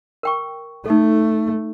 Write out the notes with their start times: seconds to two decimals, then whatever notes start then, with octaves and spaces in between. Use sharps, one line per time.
0.23 A#4 G5 C#6
0.86 A3 D#4 A4